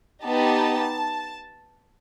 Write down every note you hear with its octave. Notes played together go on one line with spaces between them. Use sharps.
B3 D#4 G4 A5